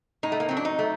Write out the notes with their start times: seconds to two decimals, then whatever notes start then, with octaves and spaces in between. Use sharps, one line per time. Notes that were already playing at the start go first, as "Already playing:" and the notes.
0.23 A2 D#4
0.32 A3
0.40 A#3
0.49 F#3 C4
0.57 D4
0.65 D#4
0.79 A3